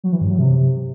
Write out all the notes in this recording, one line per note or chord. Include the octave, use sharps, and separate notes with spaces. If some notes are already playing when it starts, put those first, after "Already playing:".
F#3
E3
G2
F#3
C3